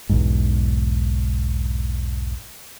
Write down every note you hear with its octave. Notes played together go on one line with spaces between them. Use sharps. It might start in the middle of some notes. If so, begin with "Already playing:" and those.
B1 E2 G#2